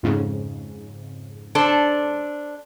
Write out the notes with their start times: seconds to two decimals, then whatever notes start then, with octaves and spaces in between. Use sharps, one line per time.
0.03 F2 G#2 C#3
1.55 D4 A4 C5